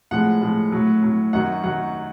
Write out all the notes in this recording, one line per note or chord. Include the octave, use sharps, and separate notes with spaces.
A2 F3 G#3 F#5
A2 F3 G#3
A2 F#3
A2 F#3
F#2 D#3 F#3 F#5
D#3 F#3 F#5